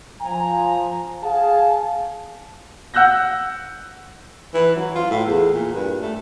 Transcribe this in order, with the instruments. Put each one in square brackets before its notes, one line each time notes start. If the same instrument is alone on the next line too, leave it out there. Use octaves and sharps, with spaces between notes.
[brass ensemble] F3 G#5 A#5
G#4 F5 A5
[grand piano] F#5 E6 F#6 G6 A#6
[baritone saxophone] E3
F#3
F4
A2
E2
A#2
G2
A3